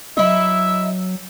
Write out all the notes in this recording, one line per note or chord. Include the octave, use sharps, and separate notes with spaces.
F#3 D#4 E4 E5